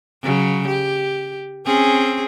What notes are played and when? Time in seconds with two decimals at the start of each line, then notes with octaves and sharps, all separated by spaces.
0.23 C#3 F#3
0.67 G4
1.66 C4 C#4 G#4